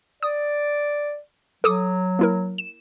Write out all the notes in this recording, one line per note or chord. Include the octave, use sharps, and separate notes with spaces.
D5 D#6
F#3 A4 D6 D#6
A#3 E4 A#4
E7